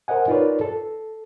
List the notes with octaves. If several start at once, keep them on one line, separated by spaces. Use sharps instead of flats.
A#4 C5 D#5 F#5 G#5
D#4 F4 A#4 B4 C#5 D5
A4